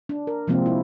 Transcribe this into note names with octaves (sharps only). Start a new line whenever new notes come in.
D4
A#4
C3 F3 G#3 A#3 C4
E4